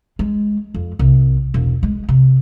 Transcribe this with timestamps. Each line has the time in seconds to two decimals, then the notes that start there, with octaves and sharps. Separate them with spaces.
0.19 G#3
0.74 F2
0.99 C2
1.54 E1
1.83 G#3
2.09 C3